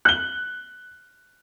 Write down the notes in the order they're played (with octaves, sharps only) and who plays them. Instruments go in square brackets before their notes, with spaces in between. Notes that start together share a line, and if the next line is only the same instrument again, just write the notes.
[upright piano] F#6 G7